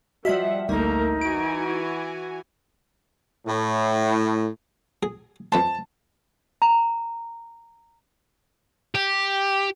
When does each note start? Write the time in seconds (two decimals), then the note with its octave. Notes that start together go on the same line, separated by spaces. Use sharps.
0.25 F3 G3 F#4 D#5 E5 F#5
0.69 A1 D2 G3 A3 A#3 D#4 A#4
1.21 E3 F#4 G#5 D7
3.47 A2
5.03 G#4
5.52 F2 B4 A5 C6
6.62 A#5
8.95 G4